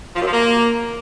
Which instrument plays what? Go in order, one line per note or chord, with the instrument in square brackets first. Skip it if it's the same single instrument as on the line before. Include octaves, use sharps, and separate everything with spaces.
[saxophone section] F3
F#2
F3
A#3